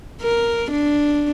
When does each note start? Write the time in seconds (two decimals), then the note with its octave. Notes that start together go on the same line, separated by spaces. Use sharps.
0.22 A#4
0.71 D4